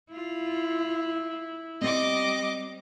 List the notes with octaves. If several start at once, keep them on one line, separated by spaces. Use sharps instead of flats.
E4 F4
G3 C4 D5 D#5 D6